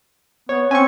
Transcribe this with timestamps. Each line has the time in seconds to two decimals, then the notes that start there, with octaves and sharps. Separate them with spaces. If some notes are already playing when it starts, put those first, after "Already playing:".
0.49 B3 C#5
0.71 C4 C#4 G#5 C#6